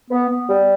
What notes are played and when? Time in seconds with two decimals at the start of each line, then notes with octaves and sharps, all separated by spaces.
0.11 B3
0.30 B3
0.49 G3